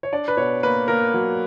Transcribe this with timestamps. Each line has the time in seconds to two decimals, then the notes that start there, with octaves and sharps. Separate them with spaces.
0.03 C#5
0.12 D4 D5
0.28 B4
0.37 B2 C#5
0.63 A#3 B4
0.88 A#3 A#4
1.14 F#3